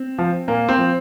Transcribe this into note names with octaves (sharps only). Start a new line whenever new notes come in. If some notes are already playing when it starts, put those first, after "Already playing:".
Already playing: C4
F3
A#2 A#3
C4
F3